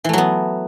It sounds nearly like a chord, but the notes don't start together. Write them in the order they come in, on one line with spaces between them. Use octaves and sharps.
E3 A3 F#3 B3